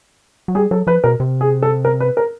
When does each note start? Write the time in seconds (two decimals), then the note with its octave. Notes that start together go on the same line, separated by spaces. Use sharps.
0.48 F#3
0.55 G3 G#4
0.71 F#3 A4
0.87 F3 B4
1.04 B2 A#4
1.20 C3
1.41 G#4
1.63 A4
1.85 A#4
2.00 B4
2.17 A#4